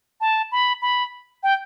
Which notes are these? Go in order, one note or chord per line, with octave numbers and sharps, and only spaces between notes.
A5
B5
B5
G5